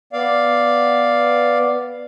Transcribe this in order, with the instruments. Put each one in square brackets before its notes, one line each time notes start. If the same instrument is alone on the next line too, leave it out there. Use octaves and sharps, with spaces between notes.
[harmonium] B3 D5 F5